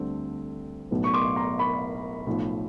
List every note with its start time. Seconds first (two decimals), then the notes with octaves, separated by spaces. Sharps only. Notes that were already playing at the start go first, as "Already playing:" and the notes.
Already playing: D2 D3 G3 C4
0.91 B1 A2 F#3 B3
1.04 C#6
1.14 C6 D6
1.36 A#5 C6
1.59 B5 C#6
2.26 B1 A2 F3